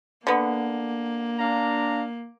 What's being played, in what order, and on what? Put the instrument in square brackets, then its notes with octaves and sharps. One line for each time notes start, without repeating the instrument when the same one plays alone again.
[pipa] D3 B3 [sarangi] A#3
[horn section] D4 F5 A#5